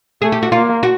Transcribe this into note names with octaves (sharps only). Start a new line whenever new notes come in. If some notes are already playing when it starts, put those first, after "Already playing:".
A3 G#4
G4
F#4
A#3 F4
F#4